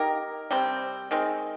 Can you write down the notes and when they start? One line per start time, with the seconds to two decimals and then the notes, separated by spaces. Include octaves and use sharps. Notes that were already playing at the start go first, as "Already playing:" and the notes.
Already playing: A#3 D#4 G4 A#4
0.51 C3 G3 C4
1.11 D#3 G#3 C4